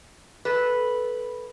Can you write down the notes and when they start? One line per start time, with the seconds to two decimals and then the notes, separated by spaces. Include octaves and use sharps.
0.45 A4 B4